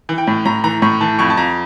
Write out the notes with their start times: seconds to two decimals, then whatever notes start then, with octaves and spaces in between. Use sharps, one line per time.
0.09 E3
0.18 G5
0.27 A2
0.45 A2 A#5
0.64 E3 A#5
0.82 A2 C#6
1.01 E3 A5
1.19 F2 C#6
1.30 A5
1.37 F2 A#5